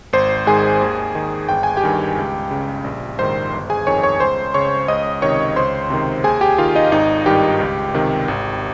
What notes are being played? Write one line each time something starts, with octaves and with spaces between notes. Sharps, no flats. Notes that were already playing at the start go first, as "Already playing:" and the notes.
G#1 C5 C6
G#2 D#3 G#4 G#5
D#2
D#3
G1 G5
G#5
G4 G5
G2 D#3
C#2
C#3
A#1
G#2 D#3 C5 C6
G1
G#4 G#5
F2 D#3 C#5 C#6
C#5 C#6
C#2 C5 C6
C#3 C#5 C#6
C#2 D#5 D#6
C3 D#3 C#5 C#6
C#2 C5 C6
C3 D#3
D#2 G#4 G#5
G4 G5
D#3 F4 F5
D#4 D#5
G#1 D#4 D#5
G2 D#3 G4 G5
C#2
C3 D#3
G#1